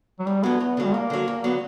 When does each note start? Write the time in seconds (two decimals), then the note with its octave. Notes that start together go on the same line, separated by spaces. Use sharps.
0.19 F#3
0.27 E2 G3
0.43 D3 F#3 B3
0.61 E2 B3
0.77 D3 F#3
0.85 G3
0.94 E2 A#3
1.10 D3 F#3
1.28 E2
1.44 D3 F#3 B3